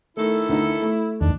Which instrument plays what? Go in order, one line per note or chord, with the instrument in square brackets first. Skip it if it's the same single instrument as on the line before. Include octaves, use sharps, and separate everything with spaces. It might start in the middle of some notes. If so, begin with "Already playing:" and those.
[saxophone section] D#3 A4 [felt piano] A3 [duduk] E4
[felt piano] D2 D#4
A3
[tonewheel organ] E2 D#3 [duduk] D4